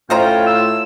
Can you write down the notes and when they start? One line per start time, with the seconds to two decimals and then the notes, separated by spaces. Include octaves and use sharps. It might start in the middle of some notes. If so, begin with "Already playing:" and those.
0.10 A2 C#4 F4 C5 D#5 G5 A#5
0.47 E6